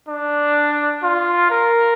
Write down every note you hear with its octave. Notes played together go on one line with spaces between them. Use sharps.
D4
F4
A#4